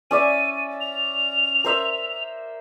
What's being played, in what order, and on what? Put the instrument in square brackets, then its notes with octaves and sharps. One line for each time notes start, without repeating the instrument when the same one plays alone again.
[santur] C#4 D5 E5 [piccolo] D#7
[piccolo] F7
[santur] A#4 C5 E5